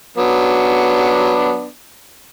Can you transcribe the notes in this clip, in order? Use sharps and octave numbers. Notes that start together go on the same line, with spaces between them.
F#3 B3 D4